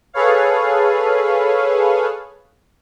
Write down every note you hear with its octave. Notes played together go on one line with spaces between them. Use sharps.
G#4 A4 B4 C#5 F5